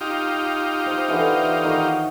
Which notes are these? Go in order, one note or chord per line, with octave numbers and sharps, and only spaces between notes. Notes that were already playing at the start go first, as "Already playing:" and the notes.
D#4 F4 G4
C5
D3 E3 F#4
D#3 F#4